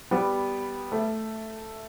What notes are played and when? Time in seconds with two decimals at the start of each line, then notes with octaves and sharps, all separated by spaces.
0.11 G3 B3
0.92 A3